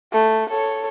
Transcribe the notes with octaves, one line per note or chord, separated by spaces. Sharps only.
A3
A4 C#5